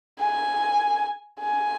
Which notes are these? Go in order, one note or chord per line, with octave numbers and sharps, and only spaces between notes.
G#5
G#5